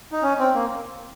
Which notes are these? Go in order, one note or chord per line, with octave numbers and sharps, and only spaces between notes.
D#4
C#4
C4
A#3